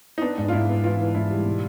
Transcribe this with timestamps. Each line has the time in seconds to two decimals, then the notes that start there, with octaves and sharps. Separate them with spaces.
0.18 D#4
0.22 B3 D4
0.38 G#2
0.48 F4
0.53 G#2 E4
0.69 B3
0.84 E3 F4
1.00 E3
1.15 G#2 E4
1.30 G3
1.45 B2